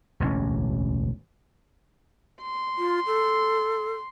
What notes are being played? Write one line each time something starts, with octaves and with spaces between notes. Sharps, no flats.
E1 A1 D2 C#4
C6
F4
A4